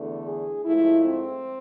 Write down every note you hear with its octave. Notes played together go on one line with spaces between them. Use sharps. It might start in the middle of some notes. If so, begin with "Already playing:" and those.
Already playing: E2 D3 A3
G#4
G#2 F3 A3 E4
C4